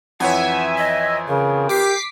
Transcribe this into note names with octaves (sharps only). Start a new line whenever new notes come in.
F2 E3 C#5 E5 F#5 G#5
D#5
C#3 A#4
G4 D6 B6 C7